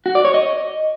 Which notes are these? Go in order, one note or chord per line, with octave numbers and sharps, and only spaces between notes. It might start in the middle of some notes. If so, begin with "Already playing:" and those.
F#4
D5
C#5
D#5